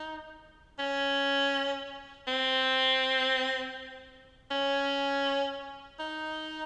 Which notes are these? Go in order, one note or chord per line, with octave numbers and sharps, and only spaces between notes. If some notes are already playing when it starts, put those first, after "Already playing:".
Already playing: D#4
C#4
C4
C#4
D#4